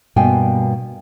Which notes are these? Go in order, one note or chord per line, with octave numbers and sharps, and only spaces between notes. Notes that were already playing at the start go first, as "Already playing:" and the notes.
G2 B2 A#3 G5 G#5